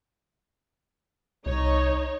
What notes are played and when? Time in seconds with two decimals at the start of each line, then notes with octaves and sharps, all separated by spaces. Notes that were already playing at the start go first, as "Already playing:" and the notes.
1.46 C2 D#4 C#5